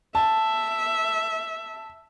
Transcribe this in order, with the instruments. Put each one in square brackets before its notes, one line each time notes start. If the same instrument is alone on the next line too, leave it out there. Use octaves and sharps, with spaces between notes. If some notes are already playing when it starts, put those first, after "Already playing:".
[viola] E5 [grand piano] A5